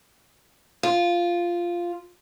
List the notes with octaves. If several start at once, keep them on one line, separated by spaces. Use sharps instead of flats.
F4